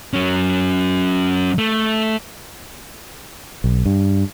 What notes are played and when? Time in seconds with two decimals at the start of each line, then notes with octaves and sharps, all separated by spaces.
0.13 F#3 C#4
1.58 A3
3.64 B1
3.86 G2